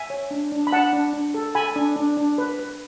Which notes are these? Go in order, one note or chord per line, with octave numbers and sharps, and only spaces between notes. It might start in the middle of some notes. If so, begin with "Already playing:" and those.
Already playing: E5 G#5
C#5
D4
D4
B5
D4 F#5 A5
D4
D4
A4
A4 G#5 B5
D4
D4
D4
B4
B4